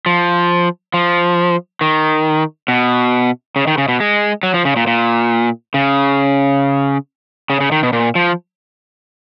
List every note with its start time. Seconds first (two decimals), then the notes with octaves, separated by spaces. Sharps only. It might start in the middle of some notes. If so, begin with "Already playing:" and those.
0.06 F3
0.94 F3
1.81 D#3
2.68 B2
3.56 C#3
3.67 D#3
3.78 C#3
3.88 B2
4.00 G#3
4.43 F#3
4.54 F3
4.65 C#3
4.76 A#2
4.87 A#2
5.74 C#3
7.50 C#3
7.60 C#3
7.72 D#3
7.83 B2
7.93 A#2
8.15 F3